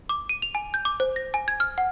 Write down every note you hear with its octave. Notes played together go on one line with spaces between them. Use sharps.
D6
D#7
F7
G#5
G6
D6
C5
A#6
G#5
G#6
F6
F#5